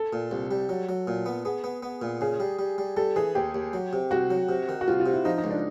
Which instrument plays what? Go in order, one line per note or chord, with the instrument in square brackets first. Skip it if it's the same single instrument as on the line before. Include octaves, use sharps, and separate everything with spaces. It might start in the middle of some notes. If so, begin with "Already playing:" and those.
Already playing: [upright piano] A4
[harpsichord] A#2
C2
G3
F#3
F#3
A#2
B3
[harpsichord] B3 [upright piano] G#4
[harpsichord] B3
B3
A#2
[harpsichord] C#3 [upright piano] G#4
[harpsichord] G3
G3
G3
[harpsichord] G3 [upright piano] A4
[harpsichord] E3 [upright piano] G#4
[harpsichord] D#2 [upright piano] G4
[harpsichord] D#2
F#3
C3
[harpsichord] C2 [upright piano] F#4
[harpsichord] F#3
C3
D#3
[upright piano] F#4
[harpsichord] C2 [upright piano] F4
[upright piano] F4
[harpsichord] C3
[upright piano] E4
[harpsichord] F3 [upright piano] D#4
[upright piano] D#4
[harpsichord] C#2
[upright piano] D4